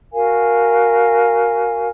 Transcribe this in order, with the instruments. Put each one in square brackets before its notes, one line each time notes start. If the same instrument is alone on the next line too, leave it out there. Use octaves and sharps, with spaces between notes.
[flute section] F#4 A#4 F5 G#5